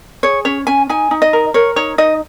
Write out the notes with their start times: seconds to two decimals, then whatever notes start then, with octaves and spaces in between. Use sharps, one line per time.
0.23 G#4 C#5
0.45 C#4 C#5
0.67 C#4 G#5
0.89 D#4 G#5
1.11 D#4
1.22 D#5
1.33 A#4
1.54 A#4 C#5
1.76 D#4 C#5
1.98 D#4 D#5